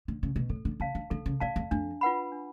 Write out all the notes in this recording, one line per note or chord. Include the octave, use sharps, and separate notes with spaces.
D3
C#3
B2
A2 A4
D3
C#3 D5 F5 A5
D3
D3 A4
C#3
B2 D5 F5 A5
F2
F2 D4
F4 B4 F#5 B5
D4